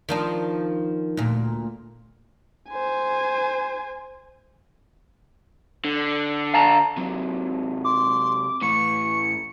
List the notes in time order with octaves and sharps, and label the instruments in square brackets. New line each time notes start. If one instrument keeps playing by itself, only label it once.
[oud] D#3 F3 D4
D2 A#2
[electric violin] C5 G#5
[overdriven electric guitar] D3
[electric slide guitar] F5 A5 A#5
[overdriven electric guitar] C3 F#3
[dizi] C6 [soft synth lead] D6
[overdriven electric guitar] A2 E3 [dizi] C#6 [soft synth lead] C#7